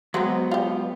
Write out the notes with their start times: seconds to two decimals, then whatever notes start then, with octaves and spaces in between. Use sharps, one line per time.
0.14 F#3 G#3 B3 C4 F#4
0.51 F4 G4